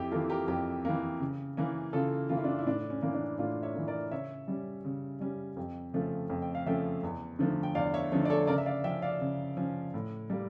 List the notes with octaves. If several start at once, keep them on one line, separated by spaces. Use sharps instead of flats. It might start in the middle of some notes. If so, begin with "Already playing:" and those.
Already playing: F2 E4 G4
E3 A#3 F4 A4
G4 A#4
F2 G4 A#4
E3 A#3
C#3
E3 A#3 C#4
C#3 F4 A4
E3 A#3 C#4 F4
E4
D4 F4
E4
A2 D4
C#4
E3 A#3 C#4
D4
A2 D4 F4
C#5 E5
E3 A#3
A#4 D5
C#3 C#5 E5
G3 C#4
C#3
G3 C#4
F2
C#3 F3 A3 C#4
F2
G5
F5
C#3 F3 A3 C#4 E5 G5
E2
D3 F3 A3
G5
E2 D5 F5
C#5 E5
D3 F3 A3 A4 C#5
D5
A4 C#5
C#3 A#4 D5
E5
D5 F5
F3 C#4 E5 G5
D5 F5
C#3
F3 C#4
A2
G3 A#3